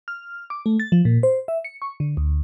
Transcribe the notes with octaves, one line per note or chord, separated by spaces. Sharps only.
F6
D6
A3
A6
F3
A#2
C5
E5
C#7
C#6
D3
D2